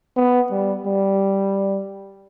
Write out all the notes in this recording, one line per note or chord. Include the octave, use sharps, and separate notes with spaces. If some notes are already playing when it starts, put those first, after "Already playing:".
B3
G3
G3